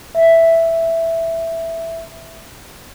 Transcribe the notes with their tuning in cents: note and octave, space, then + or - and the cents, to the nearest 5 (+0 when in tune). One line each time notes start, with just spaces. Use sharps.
E5 +5